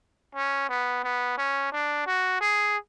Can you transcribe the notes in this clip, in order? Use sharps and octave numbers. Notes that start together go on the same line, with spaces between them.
C#4
B3
B3
C#4
D4
F#4
G#4